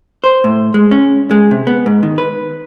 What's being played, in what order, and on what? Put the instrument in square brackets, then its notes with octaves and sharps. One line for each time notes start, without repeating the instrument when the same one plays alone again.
[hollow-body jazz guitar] C5
A2
G#3
C#4
G#3
C3
B3
G#2
D#3
B4